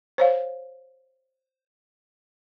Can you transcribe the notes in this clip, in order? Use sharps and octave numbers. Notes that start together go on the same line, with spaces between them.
C5 C#5 F5